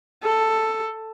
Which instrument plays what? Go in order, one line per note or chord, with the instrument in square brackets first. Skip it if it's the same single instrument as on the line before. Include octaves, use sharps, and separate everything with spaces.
[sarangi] A4